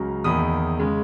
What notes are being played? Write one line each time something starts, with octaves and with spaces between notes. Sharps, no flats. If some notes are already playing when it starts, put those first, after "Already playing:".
Already playing: C#2 C#3 F#3 A#5
E2 D#3 A#3 B5 D#6
C#3 G#3